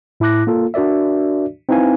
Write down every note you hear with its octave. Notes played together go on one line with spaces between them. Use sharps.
A2 E4 A5 D6 F#6 A#6
A#3 F4 A4
D4 F#4 A#4 D5 E5
C4 D#4 E4 B4 F5 G#5